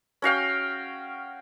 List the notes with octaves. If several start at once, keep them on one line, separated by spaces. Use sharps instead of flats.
C#4 F#4 F5 G5